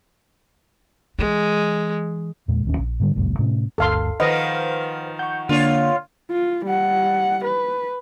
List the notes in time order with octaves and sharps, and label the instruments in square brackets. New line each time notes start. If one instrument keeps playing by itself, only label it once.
[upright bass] E3 [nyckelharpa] G#3
[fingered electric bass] E2 A#2 G#3
D1 D#2 C#4
A#1
G#2 D3 G3
G1 C#2 F#2 A#2
A2 C3 A3 C#4
[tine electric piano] G1 D2 G2 [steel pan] A4 F5 C6
[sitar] D#3 F3 [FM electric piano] B4 C5 F6 [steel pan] D#5 [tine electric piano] F#5
[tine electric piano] F#5 [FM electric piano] C#6 G6
[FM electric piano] D3 A#3 D4 [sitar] F4 C#5
[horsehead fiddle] F4
G3 F#5
B4